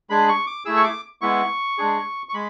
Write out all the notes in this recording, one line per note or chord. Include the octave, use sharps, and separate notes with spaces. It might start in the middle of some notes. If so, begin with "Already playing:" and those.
G#3 D4 G#4 B5
C#6
D6
A3 E4 G#4 E6
C#6
D6
G#3 B3 E4 C#6
G#3 D4 G#4
C#6
G#3 B5